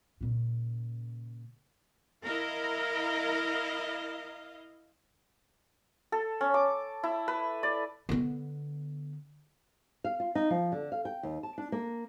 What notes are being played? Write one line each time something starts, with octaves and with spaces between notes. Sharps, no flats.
A#2 C#3
E4 A#4 D#5 F5
A4
C#4
D6
E4
B4
D5
D3 B3
F5
F4
D#4
F3
D3
F5
G5
D#2
A5
D4
A#3